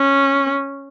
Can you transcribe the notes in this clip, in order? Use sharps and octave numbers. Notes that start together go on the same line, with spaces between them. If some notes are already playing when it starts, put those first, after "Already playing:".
Already playing: C#4